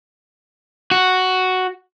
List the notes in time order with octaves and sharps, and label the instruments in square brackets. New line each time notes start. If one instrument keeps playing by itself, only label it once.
[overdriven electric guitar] F#4